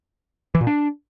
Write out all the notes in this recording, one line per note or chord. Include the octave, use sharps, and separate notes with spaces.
E3
A#2
D4